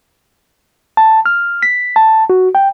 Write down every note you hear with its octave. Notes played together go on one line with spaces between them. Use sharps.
A5
F6
B6
A5
F#4
G5